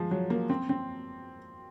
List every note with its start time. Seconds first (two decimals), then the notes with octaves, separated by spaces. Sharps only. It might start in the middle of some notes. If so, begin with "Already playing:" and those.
Already playing: F3 G#3
0.11 F#3
0.30 A#3
0.50 C4
0.69 C4